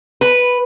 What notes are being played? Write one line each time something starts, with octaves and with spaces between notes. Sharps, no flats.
B4